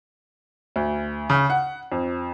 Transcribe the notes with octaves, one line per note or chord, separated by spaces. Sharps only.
D2
C#3
F#5
F2